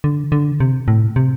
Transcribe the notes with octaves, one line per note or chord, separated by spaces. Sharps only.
D3
D3
C3
A2
C3